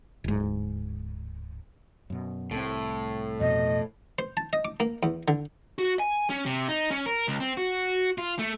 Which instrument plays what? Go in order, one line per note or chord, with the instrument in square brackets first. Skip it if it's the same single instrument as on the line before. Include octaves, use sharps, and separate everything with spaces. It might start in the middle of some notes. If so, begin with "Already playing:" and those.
[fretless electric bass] D1 G#2
F#2 B2
[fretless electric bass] C2 A3 C4 [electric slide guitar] A2
[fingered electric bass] F2 B2 [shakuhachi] D#5
[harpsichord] C5
A5
D#5
D6
A#3
E2
D3
[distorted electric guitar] F#4
G#5
C#4
C3
D#4
C#4
A#4
C#2
C4
F#4
F4
A3